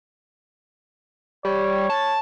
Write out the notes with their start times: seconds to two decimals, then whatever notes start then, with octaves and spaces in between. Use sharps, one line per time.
1.45 G3 C#5
1.90 A5